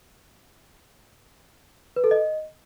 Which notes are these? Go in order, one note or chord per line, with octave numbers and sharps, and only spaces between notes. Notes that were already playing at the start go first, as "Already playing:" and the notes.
B4
A4
D#5